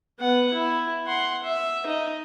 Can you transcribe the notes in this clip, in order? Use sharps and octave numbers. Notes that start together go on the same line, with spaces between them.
B3 F#5
E4
F#5 C6
E5
D#4 D#5